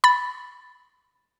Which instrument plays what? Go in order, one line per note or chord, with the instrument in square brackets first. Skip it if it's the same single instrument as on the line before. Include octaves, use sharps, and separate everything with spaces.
[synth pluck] B5 A6